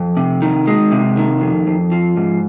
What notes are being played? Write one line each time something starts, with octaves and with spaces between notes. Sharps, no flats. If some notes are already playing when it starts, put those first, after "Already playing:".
Already playing: F2
C3
D#3
G#3
C3
D#3
F2
F2
F3
G#2